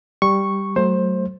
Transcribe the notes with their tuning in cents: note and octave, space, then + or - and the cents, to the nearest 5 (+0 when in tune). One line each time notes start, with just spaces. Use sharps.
G3 +0 C#6 -5
F#3 +30 A3 +0 C5 +15